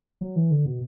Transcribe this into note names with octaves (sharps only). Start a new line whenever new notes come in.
F#3
E3
D3
B2